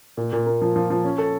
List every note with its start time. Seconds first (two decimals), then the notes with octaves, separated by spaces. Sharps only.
0.17 A#2
0.33 A#2
0.46 A#3
0.62 F3
0.76 F3
0.90 F3
1.04 C#4
1.18 A4